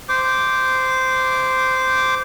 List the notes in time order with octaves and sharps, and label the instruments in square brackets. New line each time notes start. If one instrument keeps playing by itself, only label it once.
[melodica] C5 D6